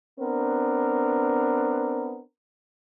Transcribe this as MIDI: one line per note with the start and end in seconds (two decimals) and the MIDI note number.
0.19 2.21 59
0.19 2.21 60
0.19 2.21 62
0.19 2.21 70